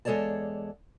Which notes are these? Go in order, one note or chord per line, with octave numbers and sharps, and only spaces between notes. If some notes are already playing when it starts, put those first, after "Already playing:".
E2 G#3 A4 C#5 D5 A5